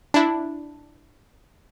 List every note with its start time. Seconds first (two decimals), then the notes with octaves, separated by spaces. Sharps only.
0.14 D4 E4